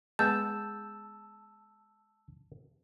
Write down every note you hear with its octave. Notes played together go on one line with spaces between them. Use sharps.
G#3 B3 G#5 A5 E6 G6